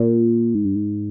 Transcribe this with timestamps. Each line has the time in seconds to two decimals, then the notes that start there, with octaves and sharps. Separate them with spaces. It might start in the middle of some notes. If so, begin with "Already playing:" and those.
Already playing: A#2
0.54 G#2
0.65 G2
0.75 G#2